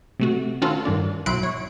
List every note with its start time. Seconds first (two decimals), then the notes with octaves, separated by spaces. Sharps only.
0.20 C3 A3 F#4
0.62 D#3 C#4 F4 F#4 A4 B4
0.85 G2 D#3 D4
1.26 B1 F#3 E4 C6 F#6 D7
1.43 C#5